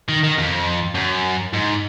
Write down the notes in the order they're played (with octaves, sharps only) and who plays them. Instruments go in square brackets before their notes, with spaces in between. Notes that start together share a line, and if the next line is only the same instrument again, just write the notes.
[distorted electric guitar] D#3
D#3
F2
F#2
G#2